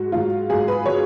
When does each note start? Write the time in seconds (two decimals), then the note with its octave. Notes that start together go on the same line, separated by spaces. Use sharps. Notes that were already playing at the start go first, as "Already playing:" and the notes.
Already playing: G#2 F#3 F#4
0.12 G#2 F#3 F4
0.49 G#2 F#3 G#4
0.68 B4
0.86 F#3 C#5